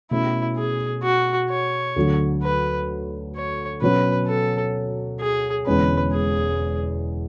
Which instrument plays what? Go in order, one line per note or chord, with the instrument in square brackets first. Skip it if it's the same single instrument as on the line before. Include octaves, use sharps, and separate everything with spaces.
[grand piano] B2 A3 C#4 [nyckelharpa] E4
[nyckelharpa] G#4
F#4
C#5
[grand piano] D2 D3 F#3
[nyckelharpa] B4
C#5
[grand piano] B2 F#3 C#4 [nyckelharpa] B4
[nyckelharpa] A4
G#4
[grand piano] E1 E2 D3 G#3 C#4 [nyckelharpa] B4
[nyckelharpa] G#4